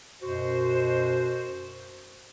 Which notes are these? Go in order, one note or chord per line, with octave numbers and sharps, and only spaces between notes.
F#2 B2 F#4 C5